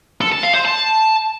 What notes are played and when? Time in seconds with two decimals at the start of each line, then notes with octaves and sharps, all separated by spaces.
0.21 A4
0.32 A5
0.43 F5
0.54 C5
0.65 A5